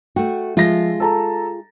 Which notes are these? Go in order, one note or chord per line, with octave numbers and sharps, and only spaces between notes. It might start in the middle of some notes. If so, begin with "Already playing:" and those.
A3 F#4 G5
F3 G#3 F4 E5 A#6
A4 A5 A#5